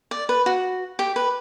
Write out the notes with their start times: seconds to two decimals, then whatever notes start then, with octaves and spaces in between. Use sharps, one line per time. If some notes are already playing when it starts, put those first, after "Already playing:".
0.11 D5
0.29 B4
0.46 F#4
0.99 G4
1.16 B4